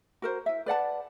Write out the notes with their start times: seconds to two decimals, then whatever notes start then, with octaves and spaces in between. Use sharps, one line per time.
0.22 F#4 A#4 C5
0.46 E4 E5
0.66 B4 D5 F#5 A5